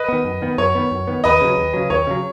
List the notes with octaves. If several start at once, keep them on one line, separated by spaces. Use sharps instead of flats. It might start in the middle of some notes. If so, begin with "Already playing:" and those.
Already playing: B4 D#5
D#3 B3
F#2
D#3 B3
F#2 C#5
D#3 B3
F#2
D#3 B3
D#2 B4 D#5
C#3 F#3
D#2
C#3 F#3
D#2 C#5
C#3 F#3